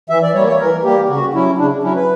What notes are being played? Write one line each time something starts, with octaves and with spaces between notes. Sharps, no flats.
E3 E5
D5
G3 A#3 C#5
C#5
E3 A#4
G3 A#3 G4
C#3 F#4
F#3 C#4 E4
C#3 D4
F#3 C#4 E4
B4